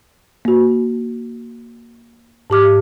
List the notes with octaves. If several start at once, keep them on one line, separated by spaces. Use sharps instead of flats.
A#3 F#4
G#2 G4 D6 F6